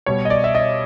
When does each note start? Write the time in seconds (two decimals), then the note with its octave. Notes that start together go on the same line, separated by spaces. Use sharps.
0.06 B2 G3 C#5
0.25 D#5
0.30 D5
0.44 E5
0.55 D#5